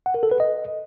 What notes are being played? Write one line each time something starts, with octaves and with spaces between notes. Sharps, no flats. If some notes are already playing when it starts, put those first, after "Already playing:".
F#5
A#4
A4
B4
D#5